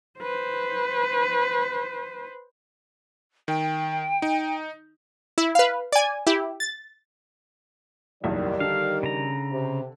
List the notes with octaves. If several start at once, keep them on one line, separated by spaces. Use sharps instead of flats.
B4 C5
D#3 G5
D#4
E4
B4 F5
D5 G#5
E4 G4
A6
F#1 B1 E2 D#3 G3 D5
D3 A4 F5
C#3 A#5
C3